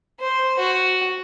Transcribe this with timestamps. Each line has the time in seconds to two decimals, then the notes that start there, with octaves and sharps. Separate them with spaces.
0.20 C5
0.59 F#4